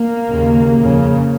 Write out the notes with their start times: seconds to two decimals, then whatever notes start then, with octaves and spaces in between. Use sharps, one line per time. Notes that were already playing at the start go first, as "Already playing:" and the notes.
Already playing: A#3
0.29 D#2 C#3
0.78 F2 C#3